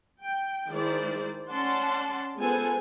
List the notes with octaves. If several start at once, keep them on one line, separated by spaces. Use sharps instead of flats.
G5
D#3 G#3 E4 C5 D5
C#4 D5 F#5 A5 C6
G#3 B3 F4 A4 C5 G#5